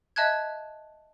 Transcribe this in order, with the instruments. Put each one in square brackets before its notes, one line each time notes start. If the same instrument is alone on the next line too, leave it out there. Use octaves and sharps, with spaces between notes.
[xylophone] D#5 E5 A5 F#6 G#6